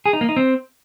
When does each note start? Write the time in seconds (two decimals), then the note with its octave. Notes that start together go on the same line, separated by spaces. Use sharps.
0.06 G#4
0.13 D#4
0.21 A#3
0.29 D#4
0.36 C4